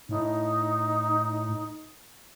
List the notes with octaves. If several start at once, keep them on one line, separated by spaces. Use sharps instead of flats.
A2 D#4